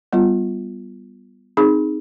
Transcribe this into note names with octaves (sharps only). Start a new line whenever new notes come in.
G3 B3 F4
C4 D#4 G#4